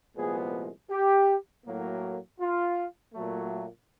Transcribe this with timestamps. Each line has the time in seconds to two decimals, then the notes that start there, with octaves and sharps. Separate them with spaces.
0.15 C2 A#2 F3 G#3 B3 G#4
0.90 G4
1.66 A2 F#3 A#3
2.40 F4
3.13 A#2 F#3 A3